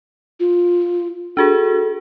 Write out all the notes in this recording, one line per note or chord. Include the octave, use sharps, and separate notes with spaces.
F4
D4 F#4 G#4 A4